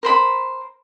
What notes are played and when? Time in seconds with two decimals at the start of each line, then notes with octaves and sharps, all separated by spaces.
0.03 A#4 C5 B5